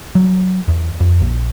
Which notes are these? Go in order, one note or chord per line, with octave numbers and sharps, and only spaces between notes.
F#3
E2
F2
A#1